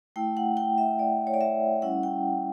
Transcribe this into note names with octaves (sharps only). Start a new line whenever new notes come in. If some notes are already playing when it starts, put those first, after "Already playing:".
A3 E4 G5
F#5
G5
E5
D5
C#5
D5
E5
G3 C#4 E4 F#5
G5